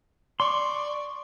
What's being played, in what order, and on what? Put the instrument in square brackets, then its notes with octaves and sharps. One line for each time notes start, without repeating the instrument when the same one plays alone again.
[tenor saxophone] D5 [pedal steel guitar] C6 C#6